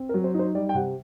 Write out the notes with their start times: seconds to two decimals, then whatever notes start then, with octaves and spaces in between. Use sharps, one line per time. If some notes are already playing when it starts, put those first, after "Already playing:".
Already playing: C4
0.09 A#4
0.14 F#3
0.24 C5
0.34 D#4
0.39 C5
0.55 G3 D5
0.69 G5
0.75 C3 F#5